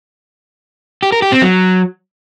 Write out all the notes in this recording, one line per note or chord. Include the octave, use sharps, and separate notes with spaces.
G4
A#4
G4
C4
F#3